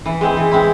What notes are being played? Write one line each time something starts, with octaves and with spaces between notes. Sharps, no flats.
E3
G#3 C4 E4
E3
G#3 C4 E4